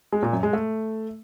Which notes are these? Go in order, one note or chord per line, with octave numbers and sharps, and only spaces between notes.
G#3
A#2
F#2
G#3
A3